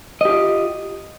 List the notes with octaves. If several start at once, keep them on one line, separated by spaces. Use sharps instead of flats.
F4 G4 D#5